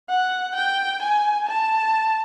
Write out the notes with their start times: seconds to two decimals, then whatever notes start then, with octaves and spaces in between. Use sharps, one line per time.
0.09 F#5
0.56 G5
1.02 G#5
1.48 A5